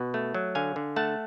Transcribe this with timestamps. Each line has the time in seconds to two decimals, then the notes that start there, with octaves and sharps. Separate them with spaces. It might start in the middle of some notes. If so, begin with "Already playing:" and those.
Already playing: B2 F#5
0.14 A3
0.34 F#3
0.55 D3 F5 G#5
0.76 D3
0.96 A3 F#5 A5